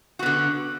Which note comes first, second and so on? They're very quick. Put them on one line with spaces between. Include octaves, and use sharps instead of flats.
F#4 B3 D3